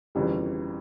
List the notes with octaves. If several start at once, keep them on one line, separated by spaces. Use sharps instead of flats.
G1 F2 C#3 E3 G3